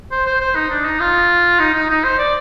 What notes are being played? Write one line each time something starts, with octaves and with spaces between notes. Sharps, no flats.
C5
C5
C5
D#4
D4
D#4
F4
D#4
D#4
D#4
C5
D5